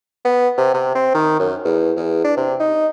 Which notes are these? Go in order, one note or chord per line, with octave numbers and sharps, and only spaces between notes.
B3
C3
C3
C4
D#3
F#2
E2
E2
D4
C3
D#4